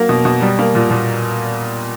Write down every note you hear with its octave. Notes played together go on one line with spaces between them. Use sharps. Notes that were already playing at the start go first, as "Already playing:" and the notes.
Already playing: F#3 A#3
B2
B2
G3
A#3
A#2
A#2